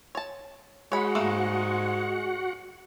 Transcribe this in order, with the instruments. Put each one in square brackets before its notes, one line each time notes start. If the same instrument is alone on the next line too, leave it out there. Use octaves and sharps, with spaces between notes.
[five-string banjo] C#5 A5
[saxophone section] G#3 [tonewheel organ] F#4 F#5 [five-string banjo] C#5 B5
[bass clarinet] G#2 [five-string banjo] G3 A3 A#3